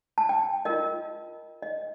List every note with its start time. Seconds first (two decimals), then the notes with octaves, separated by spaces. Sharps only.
0.18 A5
0.29 G5
0.65 F4 A#4 D#5
1.62 D#5